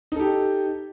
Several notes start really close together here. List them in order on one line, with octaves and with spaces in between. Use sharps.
D#4 A4 G4